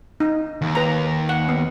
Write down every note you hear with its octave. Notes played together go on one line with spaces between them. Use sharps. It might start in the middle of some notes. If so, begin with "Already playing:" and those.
D#4
D#2
B4 A#5
F#5
B3